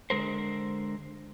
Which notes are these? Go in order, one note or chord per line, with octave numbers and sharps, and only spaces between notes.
D3 G#3 A#4 C5